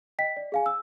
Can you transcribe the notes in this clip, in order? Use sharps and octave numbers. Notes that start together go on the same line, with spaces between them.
D#5 G5 B6
D5
G#4 F5 G#5
E6